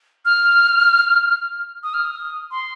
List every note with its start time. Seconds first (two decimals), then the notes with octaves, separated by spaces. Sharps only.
0.25 F6
1.83 D#6
1.94 F6
2.04 D#6
2.51 C6